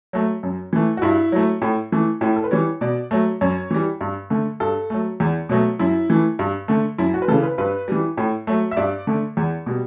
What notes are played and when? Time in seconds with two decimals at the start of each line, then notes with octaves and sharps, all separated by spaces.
0.13 F#3 A3
0.43 F#2
0.73 E3 A3
0.97 F#4
1.02 G2 E4
1.32 F#3 A3
1.62 A2
1.92 E3 A3
2.21 A2 E4
2.36 A4
2.44 B4
2.51 E3 G3 C#5
2.81 B2 D5
3.11 F#3 A3
3.41 F#2 C#5
3.71 E3 G3
4.01 G2
4.30 D3 A3
4.60 G2 A4
4.90 F#3 A3
5.20 E2
5.49 B2 F#3 A3
5.79 F#2 E4
6.10 E3 A3
6.39 G2
6.68 D3 A3
6.98 F#2 E4
7.14 F#4
7.22 B4
7.28 E3 A4
7.32 C#3
7.43 B4
7.58 G2 B4
7.88 E3 G3
8.17 A2
8.47 F#3 A3
8.71 E5
8.77 G2 D5
9.07 D3 A3
9.37 E2
9.66 B2 G3